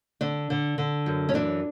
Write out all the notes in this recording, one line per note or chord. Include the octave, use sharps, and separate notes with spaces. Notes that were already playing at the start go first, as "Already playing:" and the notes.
D3 D4
D3
D3
F#2
C#4
E3 D4